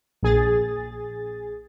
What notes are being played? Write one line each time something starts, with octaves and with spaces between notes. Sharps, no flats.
A#1 G#4 A6